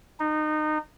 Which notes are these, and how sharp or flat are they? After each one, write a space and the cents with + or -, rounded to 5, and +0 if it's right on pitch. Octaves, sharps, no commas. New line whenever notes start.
D#4 -25